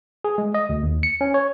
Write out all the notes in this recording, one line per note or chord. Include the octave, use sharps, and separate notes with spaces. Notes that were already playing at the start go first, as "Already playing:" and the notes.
G#4
G#3
D#5
D2
D#2
C#7
C#4
C#5